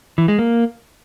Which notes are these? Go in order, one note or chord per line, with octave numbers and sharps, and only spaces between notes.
E3
G#3
A#3